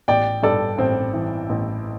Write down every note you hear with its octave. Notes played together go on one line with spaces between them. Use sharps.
A1 D5 G5
G2 A4 D5
A1 C4
E3
A1